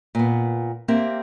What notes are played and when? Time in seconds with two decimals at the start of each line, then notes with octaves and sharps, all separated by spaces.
0.15 A#2 B3
0.88 A#3 C4 G4 A#4 E5